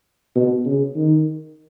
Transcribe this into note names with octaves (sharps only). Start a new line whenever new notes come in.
B2
C#3
D#3